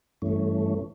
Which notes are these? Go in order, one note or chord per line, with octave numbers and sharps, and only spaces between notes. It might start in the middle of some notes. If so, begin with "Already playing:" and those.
G2 E3 A3 C#4